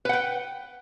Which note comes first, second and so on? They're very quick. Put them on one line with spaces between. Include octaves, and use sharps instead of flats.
B4 F#5 G5